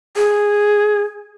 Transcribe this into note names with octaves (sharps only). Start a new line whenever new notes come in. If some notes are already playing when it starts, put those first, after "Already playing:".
G#4